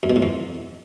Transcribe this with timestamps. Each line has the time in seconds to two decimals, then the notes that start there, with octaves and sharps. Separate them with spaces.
0.03 F#2
0.10 B2
0.16 A2
0.23 F2